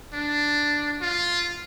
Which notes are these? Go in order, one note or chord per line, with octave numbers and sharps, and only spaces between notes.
D4
F4